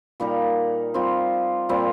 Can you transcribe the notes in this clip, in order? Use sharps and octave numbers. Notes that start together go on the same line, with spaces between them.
A#2 G3 D#4 A#4
G3 C4 F4
A#2 G3 C4